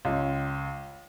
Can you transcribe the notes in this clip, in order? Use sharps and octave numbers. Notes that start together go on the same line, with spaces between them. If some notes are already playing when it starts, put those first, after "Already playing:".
C#2